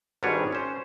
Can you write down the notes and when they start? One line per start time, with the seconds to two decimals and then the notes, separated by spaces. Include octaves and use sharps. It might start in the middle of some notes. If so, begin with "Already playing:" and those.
0.23 G#1 G#2 G3 D4 B4 C#5
0.52 C#4 C5